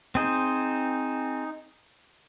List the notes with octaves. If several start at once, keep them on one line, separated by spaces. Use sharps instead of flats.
C4 D#4 G#4 C5